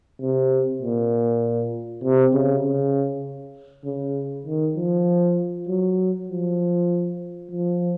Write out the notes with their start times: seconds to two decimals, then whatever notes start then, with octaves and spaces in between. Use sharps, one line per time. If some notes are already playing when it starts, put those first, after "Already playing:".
0.21 C3
0.82 A#2
2.04 C3
2.34 C#3
2.64 C#3
3.85 C#3
4.47 D#3
4.77 F3
5.68 F#3
6.29 F3
7.51 F3